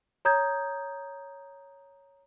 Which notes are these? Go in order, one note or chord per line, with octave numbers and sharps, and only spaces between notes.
C#5 A#5 D#6 G6 G#6